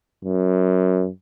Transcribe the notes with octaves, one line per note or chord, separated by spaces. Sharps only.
F#2